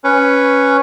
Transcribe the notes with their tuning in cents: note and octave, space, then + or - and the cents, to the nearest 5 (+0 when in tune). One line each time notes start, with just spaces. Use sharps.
C#4 +0 B4 +0